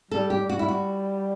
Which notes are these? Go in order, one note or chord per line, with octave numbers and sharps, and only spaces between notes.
G3 A4
G4
G3
F#4
E4
F#4